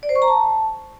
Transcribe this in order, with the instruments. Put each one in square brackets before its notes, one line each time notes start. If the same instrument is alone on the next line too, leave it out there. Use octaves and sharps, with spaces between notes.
[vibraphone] D5
C5
C#6
A#5
A5